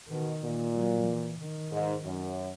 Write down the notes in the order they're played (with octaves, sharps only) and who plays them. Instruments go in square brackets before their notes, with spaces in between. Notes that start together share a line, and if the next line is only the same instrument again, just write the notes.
[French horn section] B2 [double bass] D#3
[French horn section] A#2
[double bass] F#3
E3
D#3
[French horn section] G#2
F#2